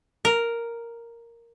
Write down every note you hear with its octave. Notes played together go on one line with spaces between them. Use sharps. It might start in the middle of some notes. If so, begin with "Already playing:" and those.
A#4